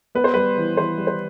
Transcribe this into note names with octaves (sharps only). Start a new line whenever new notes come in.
B3 B4
C5
G3 B4
E3
E3 C5
G3
C5